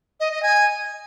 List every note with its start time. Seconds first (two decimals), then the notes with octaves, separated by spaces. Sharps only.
0.20 D#5
0.31 D#5
0.43 G#5